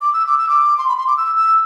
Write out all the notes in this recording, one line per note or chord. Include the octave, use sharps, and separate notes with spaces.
D6
E6
D6
E6
D6
C6
B5
C6
D6
E6
E6